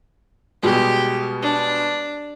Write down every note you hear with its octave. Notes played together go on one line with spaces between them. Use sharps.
B2 G3 G#3 G4
D4